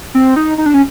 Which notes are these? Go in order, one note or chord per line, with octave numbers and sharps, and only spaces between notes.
C4
D#4
D#4
D4
C#4